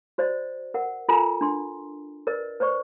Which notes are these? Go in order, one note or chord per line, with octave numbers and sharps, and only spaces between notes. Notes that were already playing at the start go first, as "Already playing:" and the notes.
F#4 C5 D5 D#5
A#4 F#5
F4 A4 A#4 G#5 A#5 B5
D4 C6
A#4 B4 D5 D#5
B4 C5 D5 C#6